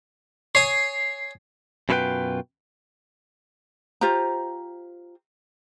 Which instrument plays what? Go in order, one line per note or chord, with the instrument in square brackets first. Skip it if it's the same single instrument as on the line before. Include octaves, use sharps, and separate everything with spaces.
[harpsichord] C#5 G#5 D#6 [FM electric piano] C7
[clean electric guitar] F#2 B2 E4 F4 B4 G5
[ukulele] F4 G4 C5 A#5